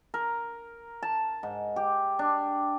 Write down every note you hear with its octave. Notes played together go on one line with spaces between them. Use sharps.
A#4
A5
G#2
G4
D4